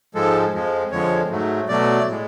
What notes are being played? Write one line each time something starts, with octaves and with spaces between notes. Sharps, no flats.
G#2 F3 G#3 A4
F2 F3 G#3
F2 D3 F3 G#3 C#5
G#2 F#3 A3
B2 F#3 A3 D5
A2 G#3